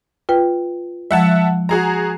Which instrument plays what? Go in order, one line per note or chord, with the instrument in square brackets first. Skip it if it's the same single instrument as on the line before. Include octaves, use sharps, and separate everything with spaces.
[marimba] F4 B4 G5
[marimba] F3 G#3 [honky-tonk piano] E5 F#5 A5
[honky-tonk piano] F#4 G#4 A#5